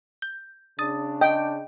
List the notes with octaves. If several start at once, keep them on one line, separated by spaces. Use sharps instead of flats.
G6
C#3 D4 D#6 A6
D#5 G5